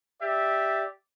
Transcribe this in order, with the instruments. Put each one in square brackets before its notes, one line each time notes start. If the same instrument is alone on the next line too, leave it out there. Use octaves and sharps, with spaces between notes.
[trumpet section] G4 D5 E5